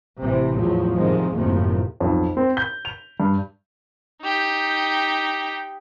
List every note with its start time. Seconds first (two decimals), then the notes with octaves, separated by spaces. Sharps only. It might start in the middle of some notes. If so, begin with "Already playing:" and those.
0.20 A1 C3 E3
0.57 E2 A2 F3 F#3
0.94 G#2 C3 D#3 F3 G#3
1.35 F#1 D#2 A2 C3 F3
2.00 B1 F2
2.37 C4
2.57 G6
2.85 F7
3.20 G2
4.22 D#4 G4